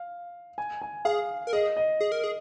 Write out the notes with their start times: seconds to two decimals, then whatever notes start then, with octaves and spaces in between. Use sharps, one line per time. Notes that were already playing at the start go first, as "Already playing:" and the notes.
Already playing: F5
0.58 G#5
0.82 G#5
1.05 G#4 F5
1.47 A#4
1.53 G#4 D#5
1.77 D#5
2.00 G#4
2.12 A#4
2.24 G#4